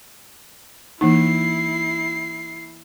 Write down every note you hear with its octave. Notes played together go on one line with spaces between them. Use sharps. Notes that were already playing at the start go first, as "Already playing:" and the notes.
E3 A#3 D#4 E4 C7